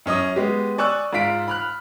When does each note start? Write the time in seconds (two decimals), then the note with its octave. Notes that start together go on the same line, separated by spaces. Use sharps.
0.06 F#2 C#4 D#5 D#6
0.36 G#3 B3 G4
0.78 D5 G#5 C#6 E6 F#6
1.13 G#2 F4 F5 B6 D7
1.48 B5 F6 F#6